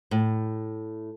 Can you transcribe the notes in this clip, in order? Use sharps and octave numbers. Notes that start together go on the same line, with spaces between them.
A2